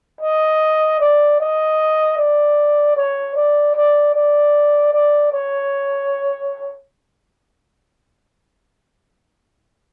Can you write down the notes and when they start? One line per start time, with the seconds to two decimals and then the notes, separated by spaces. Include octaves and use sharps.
0.21 D#5
1.00 D5
1.40 D#5
2.18 D5
2.96 C#5
3.36 D5
3.75 D5
4.15 D5
4.93 D5
5.32 C#5